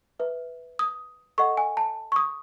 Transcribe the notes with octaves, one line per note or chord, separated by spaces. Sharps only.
B4 E5
D#6
A4 D#5 F#5 C#6
G#5
A5
C#6
D#6